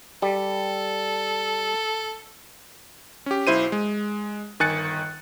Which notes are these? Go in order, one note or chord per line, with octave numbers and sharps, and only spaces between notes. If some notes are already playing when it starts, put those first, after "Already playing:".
G3 A4
C#4 G4
B1 E4 C5 D#7
G#3
G1 D#3 G#5 F#6 A6 C#7